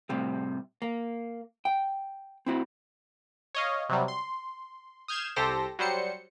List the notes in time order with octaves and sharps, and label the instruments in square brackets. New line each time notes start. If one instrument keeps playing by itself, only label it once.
[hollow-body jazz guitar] A2 C3 G3
A#3
G5
C4 E4 F#4
[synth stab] C#5 D#5 F5
C3 F#3 G3
C6
D#6 F6 G6 G#6 C7 E7
C2 G4 A4 C5 A#6
F#3 G3 C5 C#7